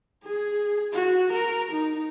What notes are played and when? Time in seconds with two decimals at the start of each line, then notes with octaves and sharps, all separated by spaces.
0.24 G#4
0.93 F#4
1.32 A#4
1.71 D#4